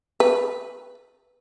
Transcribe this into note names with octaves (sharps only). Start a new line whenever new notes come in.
B4